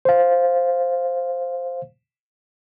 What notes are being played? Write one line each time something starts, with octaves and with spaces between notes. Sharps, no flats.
C5 F5